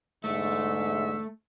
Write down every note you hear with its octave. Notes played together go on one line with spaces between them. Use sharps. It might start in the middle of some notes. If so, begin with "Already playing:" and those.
E2 G#2 D3 A3 E5